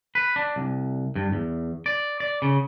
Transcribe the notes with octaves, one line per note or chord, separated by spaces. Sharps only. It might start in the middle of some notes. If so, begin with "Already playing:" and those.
B4
D4
C2
G2
E2
D5
D5
C#3